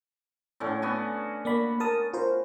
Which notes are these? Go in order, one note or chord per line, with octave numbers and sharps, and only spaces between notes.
A2 D3 C#4
B3 F#4 G#5
A#3 D5 B5
A#4 A5 D#6
F4 A#4 C5